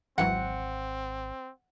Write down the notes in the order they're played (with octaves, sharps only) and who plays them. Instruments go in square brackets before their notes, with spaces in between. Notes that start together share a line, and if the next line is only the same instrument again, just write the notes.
[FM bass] G#1 [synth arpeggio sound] C#2 E3 F#3 [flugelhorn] C4 [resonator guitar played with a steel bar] F#5